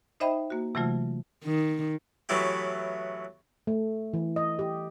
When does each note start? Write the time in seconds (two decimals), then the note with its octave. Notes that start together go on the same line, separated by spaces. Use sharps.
0.20 D#4 C5 D#5 E5 G5 B5
0.50 A#3 F#4
0.75 C3 E3 F#3 A3 F4
1.45 D#3
2.29 A2 E3 F#3 B3 E4 G4
3.67 A3
4.14 E3
4.36 D#5
4.59 G4